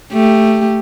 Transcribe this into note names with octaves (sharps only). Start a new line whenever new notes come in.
A3 G4